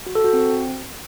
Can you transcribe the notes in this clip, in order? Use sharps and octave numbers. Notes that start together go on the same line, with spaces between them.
F#4
A4
F#4
C4